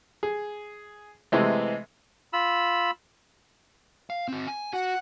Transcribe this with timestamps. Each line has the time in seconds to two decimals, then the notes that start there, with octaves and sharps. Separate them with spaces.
0.23 G#4
1.32 C3 E3 G#3 A3
2.33 F4 B5 E6
4.10 F5
4.28 C4 F#4
4.47 G#5
4.73 F#4 F#5